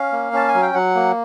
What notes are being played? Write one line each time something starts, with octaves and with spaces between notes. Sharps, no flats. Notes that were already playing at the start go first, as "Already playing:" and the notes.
Already playing: C#4 F5
A#3
C#4 A5
G#5
F#3
G5
F#3 F#5
A#3